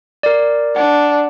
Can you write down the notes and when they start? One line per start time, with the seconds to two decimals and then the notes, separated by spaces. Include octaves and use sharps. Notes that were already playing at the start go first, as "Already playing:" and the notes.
0.23 A#4 D5
0.76 D4 F#5